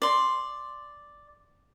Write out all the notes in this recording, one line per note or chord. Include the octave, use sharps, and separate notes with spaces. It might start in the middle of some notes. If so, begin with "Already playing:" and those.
D5 C6